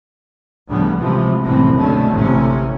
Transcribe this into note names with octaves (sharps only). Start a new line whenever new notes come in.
D2 A2 C#3 F3 G3 B3
C#2 A2 C3 E3 F3
F#1 C2 A2 C3 E3 C4
B2 D3 A3 C#4
A1 C3 C#4